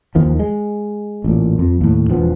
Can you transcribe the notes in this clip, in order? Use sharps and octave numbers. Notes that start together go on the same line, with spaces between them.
D#2 D#3 F3
G#3
A1 A#2
F2
D#2 A2
E1 F3 B3